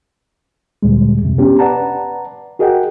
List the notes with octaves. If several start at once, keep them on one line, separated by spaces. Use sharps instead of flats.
D2 A#2 G3 G#3
F2 C3
B3 C#4 D4 G4
B4 D5 F#5 A5 A#5
F#4 G#4 A#4 D#5 F#5 G5